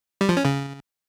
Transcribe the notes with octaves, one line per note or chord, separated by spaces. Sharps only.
G3
F3
C#4
C#3